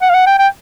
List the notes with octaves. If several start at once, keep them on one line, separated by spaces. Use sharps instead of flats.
F#5
F5
F#5
G5
G5